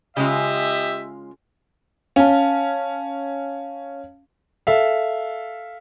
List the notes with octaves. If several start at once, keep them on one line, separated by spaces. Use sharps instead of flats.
C#3 G#3 F4 G4 D#5 E5
C#4 F5 A5
A4 E5 F5